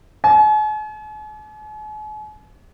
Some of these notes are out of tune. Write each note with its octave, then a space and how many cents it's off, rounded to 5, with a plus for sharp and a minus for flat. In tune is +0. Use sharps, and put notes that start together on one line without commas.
G#5 +45